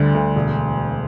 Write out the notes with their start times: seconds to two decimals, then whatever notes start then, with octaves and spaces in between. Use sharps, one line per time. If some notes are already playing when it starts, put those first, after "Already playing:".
Already playing: D2 D3 G3
0.14 D2
0.36 E1